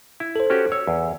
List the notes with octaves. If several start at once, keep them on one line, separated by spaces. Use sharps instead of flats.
E4
A4 C5
C#4 F#4 G4
C#5 E6
E2